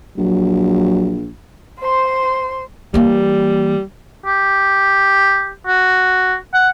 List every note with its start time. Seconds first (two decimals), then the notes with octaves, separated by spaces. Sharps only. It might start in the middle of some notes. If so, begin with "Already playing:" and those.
0.18 A#1 F#3
1.79 C5 C6
2.94 E3 G3 A#3
4.26 G4
5.67 F#4
6.54 F#5